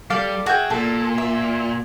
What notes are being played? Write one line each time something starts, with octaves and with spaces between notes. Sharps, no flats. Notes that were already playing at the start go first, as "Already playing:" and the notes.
G3 A4 D5 F5
F#4 G#4 E5 G5
A#2 A4
E5